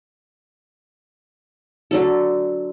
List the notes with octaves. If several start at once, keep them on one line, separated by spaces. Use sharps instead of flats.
D3 F#3 A4